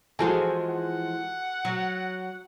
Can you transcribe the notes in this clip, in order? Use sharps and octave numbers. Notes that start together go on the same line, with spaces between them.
E3 F3 G#3 F#4 A4 G#5
F#5
F#3